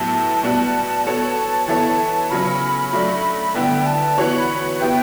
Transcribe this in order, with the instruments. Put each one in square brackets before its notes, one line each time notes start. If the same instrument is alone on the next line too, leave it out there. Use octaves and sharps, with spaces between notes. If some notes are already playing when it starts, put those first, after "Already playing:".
Already playing: [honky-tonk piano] A2 F#3 B3 E4 G4 [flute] A5
[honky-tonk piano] B2 G3 B3 F#4
B3 F#4 A4 C#5
E3 B3 E4 A4 C#5
[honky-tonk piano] C#3 F#3 C#4 [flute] B5
[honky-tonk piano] F#3 A3 D4
[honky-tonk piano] D3 G3 B3 E4 B4 [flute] G5
[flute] A5
[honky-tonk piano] E3 B3 F#4 C#5
[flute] B5
[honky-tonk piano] B3 E4 G4 B4 [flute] G5